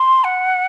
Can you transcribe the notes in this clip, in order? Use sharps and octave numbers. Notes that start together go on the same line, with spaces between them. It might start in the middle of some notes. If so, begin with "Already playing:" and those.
Already playing: C6
F#5